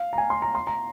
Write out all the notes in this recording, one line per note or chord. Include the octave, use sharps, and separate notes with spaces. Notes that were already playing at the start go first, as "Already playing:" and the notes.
Already playing: F5
A#5
G#5
C6
A#5
C6
A#5